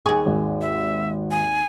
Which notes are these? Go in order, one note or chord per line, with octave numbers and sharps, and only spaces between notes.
D#2 G#4 C#6
G#1
E5
G#5